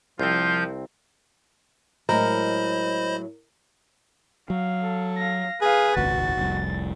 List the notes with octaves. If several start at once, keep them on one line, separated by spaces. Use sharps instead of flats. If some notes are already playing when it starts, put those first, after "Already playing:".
C2 F3 C4 F4 G6
A2 F#3 G#3 A#4 C5 D#5 B5
F#3 F5
A4
F5 A#6
G#4 B4 F5
D#1 G#1 C#2 F#4 A6
F1 C2